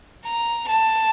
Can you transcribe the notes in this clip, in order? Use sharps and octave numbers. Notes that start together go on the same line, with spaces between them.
A#5
A5